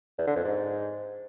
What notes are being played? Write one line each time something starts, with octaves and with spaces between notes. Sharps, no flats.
E2
D3
F2
G#2